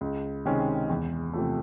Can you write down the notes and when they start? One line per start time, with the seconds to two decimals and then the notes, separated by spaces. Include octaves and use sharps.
0.01 C#2
0.45 C3 D#3 G#3 C#4
0.89 E2
1.33 C3 F3 A3